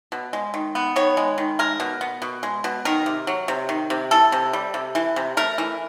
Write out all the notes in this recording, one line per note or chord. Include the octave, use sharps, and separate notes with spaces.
B2
G#3
D#3
B3
D#3 C#5
G#3
D#3
G#3 A#4
B2
B3
B2
G#3
B2
D#3 A#4
C3
F#3
C3
D#3
C3
E3 A4
C3
G3
C3
E3
C3
A3 A#4
E3